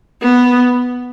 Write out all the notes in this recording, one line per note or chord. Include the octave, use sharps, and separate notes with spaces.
B3